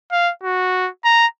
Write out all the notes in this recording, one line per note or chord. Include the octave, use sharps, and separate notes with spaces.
F5
F#4
A#5